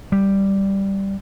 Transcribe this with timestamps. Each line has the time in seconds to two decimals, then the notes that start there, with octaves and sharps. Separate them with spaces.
0.12 G3